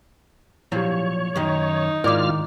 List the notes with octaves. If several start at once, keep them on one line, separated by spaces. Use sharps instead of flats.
A#2 F3 F#3 E4 G4 C#5
F#2 D#3 D#4
G#2 D#3 E4 F4 A#4 D5 D6 F6